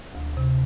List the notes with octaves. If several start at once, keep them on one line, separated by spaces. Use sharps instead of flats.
D2
C3